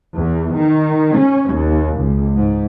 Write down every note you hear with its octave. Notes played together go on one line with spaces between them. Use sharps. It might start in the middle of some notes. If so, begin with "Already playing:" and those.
E2
D#3
C#4
D#2
C#2
G#2